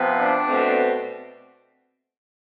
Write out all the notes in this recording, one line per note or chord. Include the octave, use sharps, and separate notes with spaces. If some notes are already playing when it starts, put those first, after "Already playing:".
Already playing: C3 F3 B3
D4
B2 A3 C4